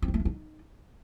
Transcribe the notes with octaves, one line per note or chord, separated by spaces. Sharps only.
C4
G3
A3
D4
D#4